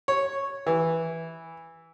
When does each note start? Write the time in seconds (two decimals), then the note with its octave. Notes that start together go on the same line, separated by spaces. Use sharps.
0.08 C#5
0.67 E3